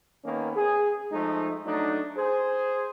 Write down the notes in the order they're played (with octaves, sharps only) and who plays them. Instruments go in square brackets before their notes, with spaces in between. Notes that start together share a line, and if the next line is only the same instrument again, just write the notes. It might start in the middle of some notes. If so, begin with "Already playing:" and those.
[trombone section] D#3 A#3 B3 C#4
G#4
F3 G#3 A3 D#4
F#3 A3 D4 D#4
G#4 C5